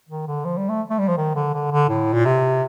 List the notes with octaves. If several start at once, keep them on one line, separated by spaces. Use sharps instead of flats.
D#3
D3
F3
G3
A3
A3
G3
F3
D#3
D3
D3
D3
A2
A#2
C3